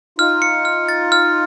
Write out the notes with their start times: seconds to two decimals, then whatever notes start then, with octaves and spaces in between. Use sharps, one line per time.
0.19 D#4 F4 F6
0.42 C#7
0.65 F6
0.89 A6
1.12 F6